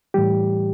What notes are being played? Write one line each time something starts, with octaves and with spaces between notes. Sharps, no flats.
A2 E3 G3 G4